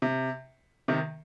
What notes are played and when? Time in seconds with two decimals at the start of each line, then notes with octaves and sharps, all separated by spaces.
0.02 C3
0.88 C3 D#3